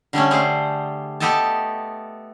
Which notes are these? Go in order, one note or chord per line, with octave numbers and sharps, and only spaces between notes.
D3 G3 A3 C#4
G3 A3 G#4 C5
A3 B3 G4 A4 D#5 A5